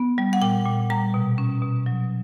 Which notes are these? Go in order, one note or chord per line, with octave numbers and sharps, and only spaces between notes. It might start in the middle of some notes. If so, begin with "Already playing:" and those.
Already playing: B3
G3
F#5
A#2 G5
A#2
G3 A#5
B2
C#4
B2
F#3